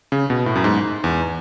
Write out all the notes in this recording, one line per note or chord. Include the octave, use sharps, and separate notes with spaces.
C#3
B2
A2
F#2
G#2
E2